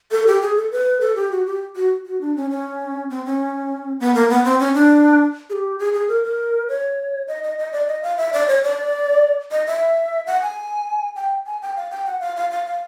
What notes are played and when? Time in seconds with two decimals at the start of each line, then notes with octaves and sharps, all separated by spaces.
0.11 A4
0.27 G4
0.42 G#4
0.56 A4
0.71 B4
1.01 A4
1.16 G4
1.32 F#4
1.46 G4
1.76 F#4
2.06 F#4
2.21 D4
2.36 C#4
2.50 C#4
3.10 C4
3.25 C#4
4.00 B3
4.15 A#3
4.30 B3
4.45 C4
4.59 C#4
4.74 D4
5.50 G#4
5.53 G4
5.79 G#4
5.93 G#4
6.08 A#4
6.24 A#4
6.69 C#5
7.28 D#5
7.43 D#5
7.58 D#5
7.72 D5
7.88 D#5
8.03 F5
8.17 E5
8.33 D5
8.48 C#5
8.63 D5
9.52 D#5
9.67 E5
10.27 F#5
10.42 G#5
11.16 G5
11.46 G#5
11.62 G5
11.76 F5
11.91 G5
12.06 F#5
12.20 F5
12.36 F5
12.51 F5
12.66 F5